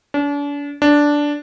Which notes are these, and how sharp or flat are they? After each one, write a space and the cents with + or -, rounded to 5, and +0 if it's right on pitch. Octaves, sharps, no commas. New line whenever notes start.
D4 -40
D4 -5